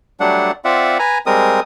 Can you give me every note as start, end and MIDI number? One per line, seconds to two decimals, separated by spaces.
0.20 0.51 54
0.20 0.51 55
0.20 0.51 57
0.20 0.51 62
0.20 0.51 78
0.65 0.98 60
0.65 0.98 65
0.65 0.98 74
0.65 0.98 76
0.65 0.98 78
0.99 1.18 71
0.99 1.18 80
0.99 1.18 82
1.26 1.60 55
1.26 1.60 56
1.26 1.60 60
1.26 1.60 70
1.26 1.60 87